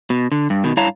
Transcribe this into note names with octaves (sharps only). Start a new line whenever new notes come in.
B2
D3
G2
B2 D#3
G2 E4 C#5 F5 A5 A#5